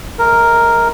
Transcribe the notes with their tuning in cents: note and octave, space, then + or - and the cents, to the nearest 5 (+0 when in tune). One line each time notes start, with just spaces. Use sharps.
G#3 +35 A#4 +0